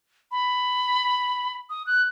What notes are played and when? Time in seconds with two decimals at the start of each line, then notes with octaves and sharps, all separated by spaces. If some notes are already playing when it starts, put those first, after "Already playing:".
0.32 B5
1.70 D#6
1.87 F#6